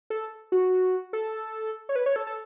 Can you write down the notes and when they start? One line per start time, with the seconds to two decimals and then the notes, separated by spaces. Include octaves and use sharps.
0.10 A4
0.52 F#4
1.13 A4
1.89 C#5
1.96 B4
2.06 C#5
2.16 A4
2.27 A4